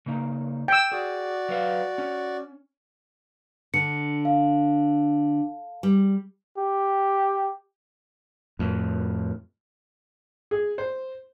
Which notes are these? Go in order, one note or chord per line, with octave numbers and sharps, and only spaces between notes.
C#3 A#3 D#4
G5 E6
F#4 G#4 D5
F#3 B4 F5
C#4
D3 C#7
F5
G3
G4
F2 A2
G#4
C5